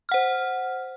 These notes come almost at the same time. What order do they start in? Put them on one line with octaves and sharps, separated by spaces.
F6 F#5 C5